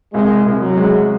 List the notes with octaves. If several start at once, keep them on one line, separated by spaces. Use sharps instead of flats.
C2 G#3
C2
F#3
G#3